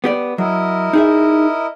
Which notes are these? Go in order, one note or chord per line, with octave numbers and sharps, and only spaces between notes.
B3 G4 D5
F#3 E4 A#4 D#5
D#4 G#4 E5